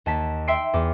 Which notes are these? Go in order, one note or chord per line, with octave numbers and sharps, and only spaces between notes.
D#2 A5 B6
E5 G5 C6 E6 C7 D7
E2 D6